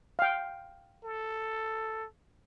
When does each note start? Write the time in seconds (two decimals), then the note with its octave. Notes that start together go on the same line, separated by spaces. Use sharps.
0.19 F5 G5
1.04 A4